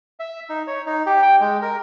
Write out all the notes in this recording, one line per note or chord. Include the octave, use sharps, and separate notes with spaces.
E5
D#4
C#5
D#4
G4
G5
G#3
A#4